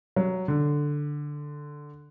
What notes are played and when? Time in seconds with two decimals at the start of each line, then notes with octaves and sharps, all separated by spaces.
0.16 F#3
0.48 D3